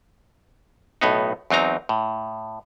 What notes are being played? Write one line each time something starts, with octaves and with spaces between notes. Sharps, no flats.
B1 A2 B3 D#4
E2 F#3 C4 D#4 A#5
A2